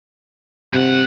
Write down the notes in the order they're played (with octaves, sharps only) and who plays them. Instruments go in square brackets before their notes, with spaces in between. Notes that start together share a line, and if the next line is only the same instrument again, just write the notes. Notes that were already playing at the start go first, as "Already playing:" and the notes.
[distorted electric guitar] G2 F#5 [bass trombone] C3